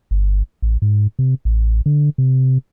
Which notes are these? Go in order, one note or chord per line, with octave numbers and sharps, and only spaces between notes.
G1
A1
G#2
C3
A1
D3
C3